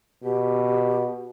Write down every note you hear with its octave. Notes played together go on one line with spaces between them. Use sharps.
B2 G4